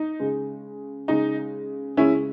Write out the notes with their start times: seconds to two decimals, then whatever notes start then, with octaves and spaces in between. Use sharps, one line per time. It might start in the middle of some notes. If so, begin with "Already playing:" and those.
Already playing: D#4
0.20 C#3 G#3
1.08 C#3 G#3 D#4
1.97 C#3 G#3 C#4 E4